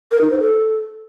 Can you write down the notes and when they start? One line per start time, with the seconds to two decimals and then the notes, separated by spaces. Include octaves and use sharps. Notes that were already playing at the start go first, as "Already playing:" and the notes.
0.11 A#4
0.21 D#4
0.30 C5
0.40 A4